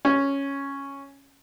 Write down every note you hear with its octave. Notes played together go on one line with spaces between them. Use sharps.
C#4